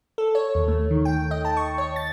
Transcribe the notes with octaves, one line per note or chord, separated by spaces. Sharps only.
A4
C#5
D#2
A3
D#3
G5
D#5
A5
C#6
C#5
A6